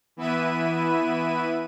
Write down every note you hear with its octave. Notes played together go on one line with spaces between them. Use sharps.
E3 B3 E4 B4 E5 D#7